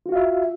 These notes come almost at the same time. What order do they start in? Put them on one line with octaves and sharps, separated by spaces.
F4 F#4 F5 E5